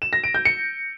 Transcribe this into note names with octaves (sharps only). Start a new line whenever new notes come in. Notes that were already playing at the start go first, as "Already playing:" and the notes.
E7
A#6
D7
G6
C#7